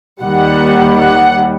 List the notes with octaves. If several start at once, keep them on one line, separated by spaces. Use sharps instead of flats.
D#2 D#3 G3 F#5
F#5